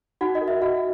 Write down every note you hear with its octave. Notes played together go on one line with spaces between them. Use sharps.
D#4 F#4 F#5
D#5
A#4
E5
F#4 F#5